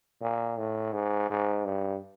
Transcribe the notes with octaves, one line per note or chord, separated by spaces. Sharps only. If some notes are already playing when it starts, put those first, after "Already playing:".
A#2
A2
G#2
G#2
G2